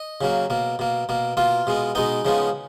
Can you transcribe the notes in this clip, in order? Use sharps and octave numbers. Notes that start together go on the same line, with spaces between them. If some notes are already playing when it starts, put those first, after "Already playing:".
Already playing: D#5
C#3 F#3 A#3
B2 A#3
B2 A#3
B2 A#3
B2 A#3 F4
B2 G#3 B3
B2 G#3 B3 D#4
C#3 F3 G#3 B3